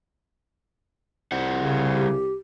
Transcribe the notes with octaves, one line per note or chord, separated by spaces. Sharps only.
C2 G3 C5 F#5
C#3
G4